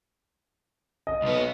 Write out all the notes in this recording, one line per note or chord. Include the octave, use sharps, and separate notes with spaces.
D#5
B1 B3